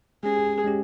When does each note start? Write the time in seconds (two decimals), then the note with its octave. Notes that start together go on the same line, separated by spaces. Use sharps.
0.23 G#3 C#4 G4 G#4
0.64 G#3 C#4 G4